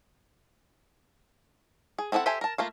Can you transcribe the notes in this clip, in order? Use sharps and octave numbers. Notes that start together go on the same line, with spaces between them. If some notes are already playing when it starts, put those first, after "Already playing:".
G#4
C4 E4 A4 D#5 F#5
G4 A4 C5 E5 G#5
A#4 A5
A3 A#3 F4